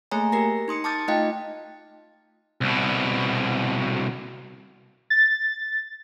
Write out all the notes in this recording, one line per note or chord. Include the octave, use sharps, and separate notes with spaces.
A3 A#3 G#4 C#5 G#5 A#5
G4 A#4 A#6
D#4 C6 D#6 C#7
A5 D6 D#6 F6 G6 A6
A3 D#4 F4 D#5 F5 G5
C2 B2
A6